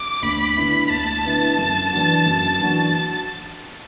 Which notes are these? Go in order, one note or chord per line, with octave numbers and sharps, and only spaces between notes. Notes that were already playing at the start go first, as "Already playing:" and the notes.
Already playing: D6
D2 B5
D3 B3 E4
D2 A5
D3 B3 E4
F#2
E3 D4 F#4
F#2
E3 D4 F#4